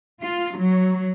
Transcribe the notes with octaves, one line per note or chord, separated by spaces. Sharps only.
F4
F#3